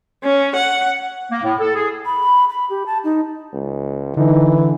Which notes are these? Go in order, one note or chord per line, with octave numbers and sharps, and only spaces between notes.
C#4
F#5
A#3
A2
A4
G#4
B5
B5
G4
A5
D#4
C#2
D3 E3 D#4